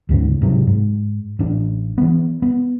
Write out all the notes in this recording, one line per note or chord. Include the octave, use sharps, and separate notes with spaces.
D2 G#2 C#3
G#2 C3 F#3
G#2
A1 D4
E3 B3
B3